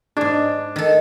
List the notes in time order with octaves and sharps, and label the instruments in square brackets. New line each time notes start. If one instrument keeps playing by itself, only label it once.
[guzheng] G#2 G#4 [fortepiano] D4
[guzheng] D#3 A4